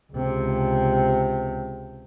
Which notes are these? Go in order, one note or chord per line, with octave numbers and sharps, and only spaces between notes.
C#2 C3